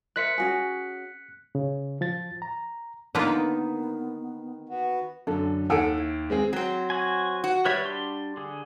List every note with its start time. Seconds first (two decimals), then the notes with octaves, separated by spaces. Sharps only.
0.16 A#4 C5 E5 F#6 B6 C#7
0.38 C#4 F#4 G#4
1.55 C#3
2.01 F3 A6
2.42 A#5
3.15 D3 D#3 A#3 B3 F4 B4
4.69 B3 F#4
5.27 F#2 D3 A4
5.70 D#2 A4 F#5 G#5 E6 D7
5.97 E4
6.30 G#3 C4 G#4
6.53 F#3 C4
6.90 F#4 G#5
7.44 F#4
7.66 G3 B4 C#5 E5
7.85 D4 C6
8.37 D3 G#4